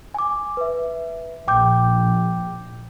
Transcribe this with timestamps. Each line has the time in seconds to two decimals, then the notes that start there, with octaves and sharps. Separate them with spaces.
0.14 G#5 D6
0.57 B4 E5
1.48 A#1 G5 D6 G6